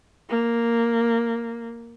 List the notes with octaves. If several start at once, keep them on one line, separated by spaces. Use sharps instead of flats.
A#3